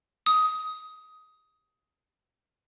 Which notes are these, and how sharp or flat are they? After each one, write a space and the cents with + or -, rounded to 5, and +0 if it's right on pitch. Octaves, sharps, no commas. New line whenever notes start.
D#6 +15